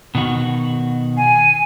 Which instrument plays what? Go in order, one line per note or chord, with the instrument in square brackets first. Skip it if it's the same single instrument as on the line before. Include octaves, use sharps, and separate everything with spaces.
[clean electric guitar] B2 D#3 F#4
[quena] G#5